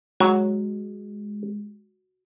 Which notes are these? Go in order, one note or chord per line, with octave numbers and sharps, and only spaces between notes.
F#3 G#3 F#4 A#5